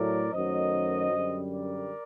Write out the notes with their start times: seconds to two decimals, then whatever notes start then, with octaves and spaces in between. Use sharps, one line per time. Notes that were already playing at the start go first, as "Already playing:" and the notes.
Already playing: A2 F#3 A3 A#4 D5
0.32 F#2 D#3 F#3 A3 C5 D#5
1.12 F#2 D3 G3
1.52 A#4 D5